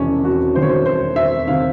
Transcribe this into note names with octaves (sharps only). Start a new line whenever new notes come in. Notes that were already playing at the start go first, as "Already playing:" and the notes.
Already playing: E1 E2 C3 D#3 C#4
F#4
E1 E2 C3 D#3 C5
C#5
C5
C5
E5
C3 D#3 F5